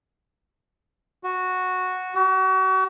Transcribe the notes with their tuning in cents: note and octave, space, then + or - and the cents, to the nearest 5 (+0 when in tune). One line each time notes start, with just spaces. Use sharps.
F#4 -5
F#4 +35